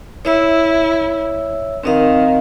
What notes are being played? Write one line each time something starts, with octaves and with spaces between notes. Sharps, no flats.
E4 C#5 E5 E6
D#3 C4 D#5 F5